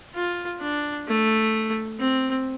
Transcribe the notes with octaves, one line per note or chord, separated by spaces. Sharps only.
F4
D4
A3
C4